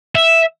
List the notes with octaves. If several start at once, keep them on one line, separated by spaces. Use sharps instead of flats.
E5